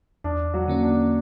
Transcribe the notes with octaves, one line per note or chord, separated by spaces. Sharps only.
E2 D4
F#3 F#4
D3 A#3 C#4
D4